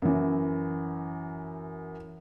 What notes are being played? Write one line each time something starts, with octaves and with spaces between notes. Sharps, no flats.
F#2 E3